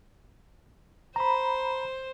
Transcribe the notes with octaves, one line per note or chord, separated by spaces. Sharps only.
C5 A#5 B5